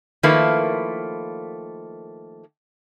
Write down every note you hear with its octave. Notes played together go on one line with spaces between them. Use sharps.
D#3 F3 A3 A#3 E4 B4